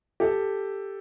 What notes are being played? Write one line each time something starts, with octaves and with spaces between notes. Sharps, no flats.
G4 A4